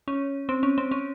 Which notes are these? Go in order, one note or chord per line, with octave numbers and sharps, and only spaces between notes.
C#4
C4
C#4
C4
C#4